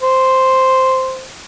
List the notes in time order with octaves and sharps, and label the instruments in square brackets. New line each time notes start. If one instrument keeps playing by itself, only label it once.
[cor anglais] C5